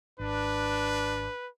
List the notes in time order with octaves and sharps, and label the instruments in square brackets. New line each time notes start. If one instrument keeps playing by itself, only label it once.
[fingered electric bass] G#1 [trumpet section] D4 [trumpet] B4